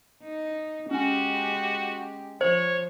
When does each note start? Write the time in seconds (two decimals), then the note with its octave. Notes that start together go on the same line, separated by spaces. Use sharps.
0.23 D#4
0.91 G#3 C#4 F#4 G4 G#5
2.41 F3 C5 C#5